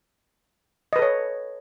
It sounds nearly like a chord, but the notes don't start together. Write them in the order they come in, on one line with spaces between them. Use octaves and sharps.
D#5 B4 A4 C#5